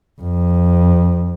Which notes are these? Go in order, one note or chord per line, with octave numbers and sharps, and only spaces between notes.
F2